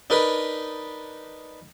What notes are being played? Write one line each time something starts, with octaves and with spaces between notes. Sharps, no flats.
D4 D#4 A#4 B4